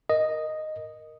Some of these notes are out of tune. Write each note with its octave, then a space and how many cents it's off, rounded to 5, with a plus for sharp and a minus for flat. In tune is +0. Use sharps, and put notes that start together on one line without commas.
A#4 +0 D#5 +0